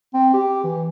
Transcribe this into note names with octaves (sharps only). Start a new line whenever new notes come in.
C4
G4
E3